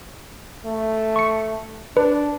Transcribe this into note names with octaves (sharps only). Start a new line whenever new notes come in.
A3
C#6 C#7
D4 B4